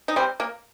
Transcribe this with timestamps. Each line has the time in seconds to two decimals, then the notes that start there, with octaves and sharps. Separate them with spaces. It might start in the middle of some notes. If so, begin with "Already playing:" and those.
0.08 D#4
0.16 G3 C4
0.40 A#3